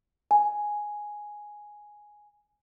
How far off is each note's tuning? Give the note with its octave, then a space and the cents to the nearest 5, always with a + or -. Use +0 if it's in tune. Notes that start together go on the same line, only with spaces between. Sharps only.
G#5 +5